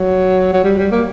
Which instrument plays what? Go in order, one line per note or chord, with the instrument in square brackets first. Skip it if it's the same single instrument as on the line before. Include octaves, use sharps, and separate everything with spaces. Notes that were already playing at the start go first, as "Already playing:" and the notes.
Already playing: [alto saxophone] F#3
F#3
G3
G3
A#3